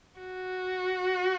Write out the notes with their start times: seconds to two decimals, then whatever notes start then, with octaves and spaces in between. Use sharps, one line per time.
0.21 F#4